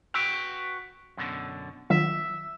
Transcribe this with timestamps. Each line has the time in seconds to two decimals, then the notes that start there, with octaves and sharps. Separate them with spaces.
0.14 F#4 B4 G5 E6
1.17 F#2 B2 D3
1.90 D#3 F#3 F4 E5